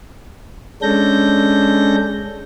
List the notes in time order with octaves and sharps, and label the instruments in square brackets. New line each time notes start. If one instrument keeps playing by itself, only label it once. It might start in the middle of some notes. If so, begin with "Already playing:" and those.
[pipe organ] G#3 C#4 D4 A4 G6 A#6